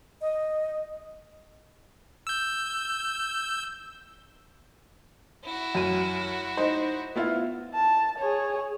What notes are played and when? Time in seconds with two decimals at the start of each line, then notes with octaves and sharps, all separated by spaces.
0.21 D#5
2.27 E6 G6
5.44 E4 F#4
5.75 F#2 D#7
6.57 D#4 C5
7.16 B3 E4 F4
7.74 A5
8.18 G#4 C#5